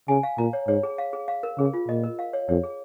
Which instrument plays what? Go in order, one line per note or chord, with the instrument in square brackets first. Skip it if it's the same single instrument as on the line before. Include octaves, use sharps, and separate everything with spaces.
[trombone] C#3 [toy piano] G#5
[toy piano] F5
[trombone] A#2 [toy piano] A#5
[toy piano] C#5
[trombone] G#2 [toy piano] C#5
[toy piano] G#4
F5
G#4
F5
A#4
[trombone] C#3 [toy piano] G#4
[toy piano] F4
[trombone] A#2 [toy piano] D#5
[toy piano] A#4
F5
C#5
[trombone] F2 [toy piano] C#5
[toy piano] G#4